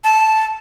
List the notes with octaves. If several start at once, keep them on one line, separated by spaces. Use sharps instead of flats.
A5